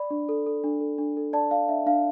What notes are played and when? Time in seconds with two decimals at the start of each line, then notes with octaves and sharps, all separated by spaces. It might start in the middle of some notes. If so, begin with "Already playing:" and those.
Already playing: D5 B5
0.11 D4
0.29 A4
0.46 A4
0.64 D4
0.81 A4
0.98 D4
1.17 A4
1.33 D5 A5
1.51 D5 F5
1.69 D4 E5
1.86 D4 F5